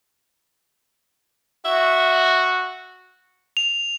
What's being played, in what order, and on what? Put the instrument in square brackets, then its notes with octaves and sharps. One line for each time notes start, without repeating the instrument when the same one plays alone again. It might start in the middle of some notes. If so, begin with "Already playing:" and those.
[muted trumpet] F#4 [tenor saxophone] E5
[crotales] F7